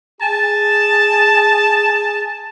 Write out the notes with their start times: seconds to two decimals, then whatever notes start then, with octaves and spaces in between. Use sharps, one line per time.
0.21 G#4 G#5 A5